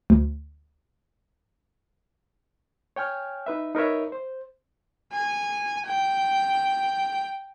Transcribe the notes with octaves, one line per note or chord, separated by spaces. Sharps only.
D2
C#5 G5 G#5 F6
D#4 B4 E5
D#4 A#4 B4 C#5 E5
C5
G#5
G5